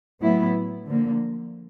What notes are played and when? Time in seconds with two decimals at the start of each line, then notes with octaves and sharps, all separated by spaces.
0.21 A2 F#3 B3 E4
0.86 D3 F3 A#3